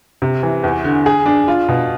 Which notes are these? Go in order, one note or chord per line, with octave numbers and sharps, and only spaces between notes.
C3
E3
E2
D3
G#4
D4
F4
B2